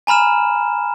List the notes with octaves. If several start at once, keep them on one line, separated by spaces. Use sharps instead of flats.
G#5 A#5 B5 F6 E7